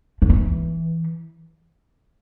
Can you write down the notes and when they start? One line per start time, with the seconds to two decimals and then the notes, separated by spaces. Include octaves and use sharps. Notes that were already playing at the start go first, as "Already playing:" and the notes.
0.22 F3
0.30 E3